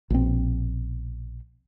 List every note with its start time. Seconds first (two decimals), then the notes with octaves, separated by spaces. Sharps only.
0.10 A#1 B2 C4